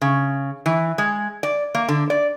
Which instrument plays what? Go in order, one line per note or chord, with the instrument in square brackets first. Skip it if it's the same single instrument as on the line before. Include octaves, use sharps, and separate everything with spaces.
[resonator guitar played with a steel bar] C#3
E3
G#3
D5
A#3
D3
D5